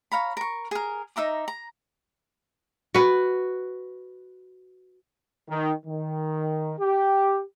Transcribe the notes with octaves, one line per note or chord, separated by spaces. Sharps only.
C#5 F5 A#5 B5
A#4 C#6
G#4 A#4
D#4 E5 A#5 D6
A#5
F#4 B4
D#3
D#3
G4